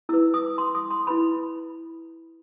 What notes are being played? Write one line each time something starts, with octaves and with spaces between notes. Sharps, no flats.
E4 B4 E6
D#6
C6
D#6
C6
E4 B4 B5